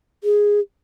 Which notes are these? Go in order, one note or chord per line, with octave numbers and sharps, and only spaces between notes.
G#4